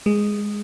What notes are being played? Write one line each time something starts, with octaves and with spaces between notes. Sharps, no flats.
G#3